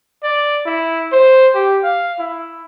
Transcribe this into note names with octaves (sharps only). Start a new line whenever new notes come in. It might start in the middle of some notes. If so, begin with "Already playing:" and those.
D5
E4
C5
G4
F5
E4